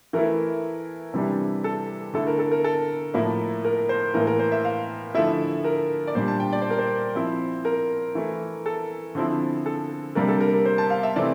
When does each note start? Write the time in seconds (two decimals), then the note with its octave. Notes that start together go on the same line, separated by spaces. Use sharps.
0.13 E3 A3 E4 A#4
1.14 C3 E3 G3 D4
1.64 A4
2.14 D3 A3 E4 A4
2.27 A#4
2.39 A4
2.52 A#4
2.64 A4
3.14 A2 F3 A#3 E4
3.65 A#4
3.89 C5
4.14 A2 E3 A#3 A#4
4.27 A#4
4.39 C5
4.52 E5
4.65 F5
5.15 D3 F3 A3 E4 E5
5.65 A#4
6.07 D5
6.15 A#2 G3 D4 C5
6.28 A5
6.40 G5
6.53 D5
6.62 C5
6.70 A#4
6.78 C5
7.15 F3 C4 E4
7.65 A#4
8.15 E3 A3 E4
8.66 A4
9.15 D3 F3 C4 E4
9.66 A4
10.15 C3 G3 A#3 D4 A#4
10.28 A4
10.41 A#4
10.53 A#4
10.65 C5
10.78 A5
10.90 F5
11.03 E5
11.16 C3 E3 A3 C4 D5